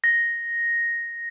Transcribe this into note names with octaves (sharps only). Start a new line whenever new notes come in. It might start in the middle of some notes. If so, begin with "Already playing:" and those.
A#6